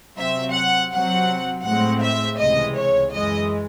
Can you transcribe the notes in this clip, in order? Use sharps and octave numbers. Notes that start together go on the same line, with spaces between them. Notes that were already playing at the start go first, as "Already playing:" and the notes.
C3 F#3 C4 E5
F#5
C3 F#3 C4 F#5
A2 G#3 C4 F#5
E5
C#2 C3 E3 G#3 D#5
C#5
F#2 E3 G#3 D#5